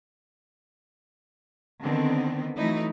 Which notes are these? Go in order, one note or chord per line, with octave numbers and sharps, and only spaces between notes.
D3 D#3 B3 C4
E3 F#3 A3 D#4 E4